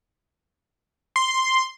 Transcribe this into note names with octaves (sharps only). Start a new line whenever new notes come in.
C6